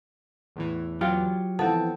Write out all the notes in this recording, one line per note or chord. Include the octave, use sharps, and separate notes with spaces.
E2 A2 E3
F#3 F4 G4
E3 F3 B3 C4 A4 F#5 A5